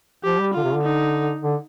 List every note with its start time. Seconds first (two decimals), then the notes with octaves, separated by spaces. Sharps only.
0.24 F3 G4
0.39 G3
0.54 D3 F4
0.63 C3
0.74 D3
0.83 D#4
1.42 D3